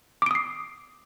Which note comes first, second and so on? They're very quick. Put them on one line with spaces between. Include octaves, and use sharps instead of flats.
D6 D7 D#6 C7